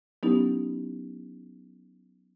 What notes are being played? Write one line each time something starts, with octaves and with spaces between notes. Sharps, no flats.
F#3 B3 C#4 D#4 E4 G4